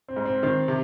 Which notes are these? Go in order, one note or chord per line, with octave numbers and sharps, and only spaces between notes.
C4
G#2
C4
D#3 C4
C3